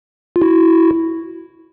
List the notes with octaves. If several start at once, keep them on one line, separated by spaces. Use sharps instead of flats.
F4
E4 F#4